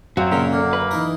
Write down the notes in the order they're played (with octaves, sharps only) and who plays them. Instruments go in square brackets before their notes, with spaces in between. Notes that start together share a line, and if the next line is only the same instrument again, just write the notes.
[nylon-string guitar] F#2 F#3 F5 [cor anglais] C4 [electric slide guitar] F#4
[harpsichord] A#2 C#3 [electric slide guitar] C#4 A#4
[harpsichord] D3 [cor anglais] A#3
[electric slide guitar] B4
[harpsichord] E3 D#4 A#4